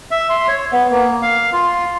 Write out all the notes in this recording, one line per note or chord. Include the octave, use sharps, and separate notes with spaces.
E5
C6
C#5
B3
A#3
F5
F4